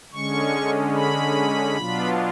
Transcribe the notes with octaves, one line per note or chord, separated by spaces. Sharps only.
D3 G#3 C#4 C#6
B5
B2 F#3 B3 D4 F4